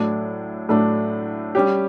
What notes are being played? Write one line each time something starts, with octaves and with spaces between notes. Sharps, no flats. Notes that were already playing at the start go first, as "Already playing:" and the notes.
Already playing: A2 F#3 A3 D4
A2 F#3 A3 D4
G3 C#4 G4